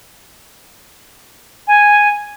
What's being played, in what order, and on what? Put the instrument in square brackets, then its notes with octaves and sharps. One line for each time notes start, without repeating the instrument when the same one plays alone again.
[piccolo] G#5